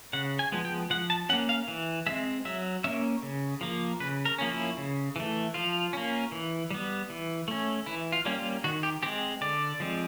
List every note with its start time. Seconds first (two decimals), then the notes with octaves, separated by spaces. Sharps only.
0.13 C#3 F#5
0.39 G#5
0.52 F3 G#3 B3
0.65 G5
0.90 F3 F#5
1.10 A5
1.29 C#4 F#5
1.33 A#3
1.49 F5
1.68 E3
2.06 G#3 C4 E5
2.45 F#3 E5
2.84 A#3 C#4 E5
3.23 C#3
3.61 F3 A#3
4.00 C#3 B4
4.25 A#4
4.38 F3 A#3 C#4
4.52 E4
4.77 C#3
5.16 E3 A3
5.54 F3 F4
5.93 A#3 C#4
6.32 E3
6.70 G3 B3
7.10 E3
7.48 A3 C#4
7.86 E3 E4
8.12 F4
8.25 G3 A#3 C#4
8.38 F4
8.64 D#3 F#4
8.83 G4
9.03 G#3 C4 G4
9.41 D3 D5
9.80 F3 G#3 C4